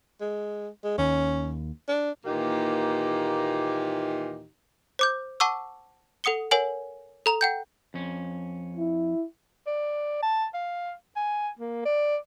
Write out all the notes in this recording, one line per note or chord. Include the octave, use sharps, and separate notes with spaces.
G#3
G#3
D#2 C#4
D4
D#2 A#2 E3 A#3 D#4 G4
C5 D6 G6
F#5 A5 C#6 D6 E6
A4 F#5 D#6 C#7 G7
A#4 C#5 F#5 G#5 F#7
A4 A#5 F7
F#5 G5 G6
F2 C#4
E4
D5
A5
F5
G#5
A#3
D5